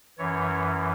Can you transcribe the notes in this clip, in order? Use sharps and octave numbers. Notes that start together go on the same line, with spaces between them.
F#2 E3 C#5